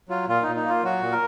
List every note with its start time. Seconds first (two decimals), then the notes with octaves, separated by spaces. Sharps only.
0.09 F#3 F4
0.28 A#2 F4
0.42 D#4
0.47 A#2
0.56 D#4
0.65 A#3 F4
0.84 F#3 F#4
1.02 A#2
1.12 A#4